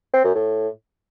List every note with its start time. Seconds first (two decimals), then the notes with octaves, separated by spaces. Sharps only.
0.13 C4
0.24 F#2
0.35 A2